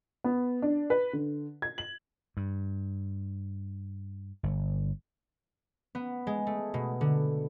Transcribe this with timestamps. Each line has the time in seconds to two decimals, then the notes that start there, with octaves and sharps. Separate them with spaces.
0.24 B3
0.62 D4
0.90 B4
1.13 D3
1.62 G#6
1.78 F#7
2.37 G2
4.43 G1
5.95 B3
6.27 G#3
6.47 A3
6.74 B2
7.01 D3